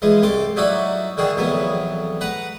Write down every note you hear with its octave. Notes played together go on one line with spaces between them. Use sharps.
E3 F3 G#3
C2 A4 C6 D6
F#3 D#4 E4 F#4 D5 E5
D3 D#3 F#4 G#4
A#1 F2 E3 F#3 B3
B4 F#5 A#5